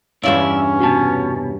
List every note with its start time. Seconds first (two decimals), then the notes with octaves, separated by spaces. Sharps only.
0.23 E2 G2 C#4 E4 F4 D5 E5
0.80 C2 B2 F#4 A5